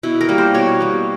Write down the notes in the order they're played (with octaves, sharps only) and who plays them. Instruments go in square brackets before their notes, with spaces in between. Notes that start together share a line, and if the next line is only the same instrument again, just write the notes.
[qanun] B2 E4
A#4
G3 A#3
C5
B2 C#5
G3 A#3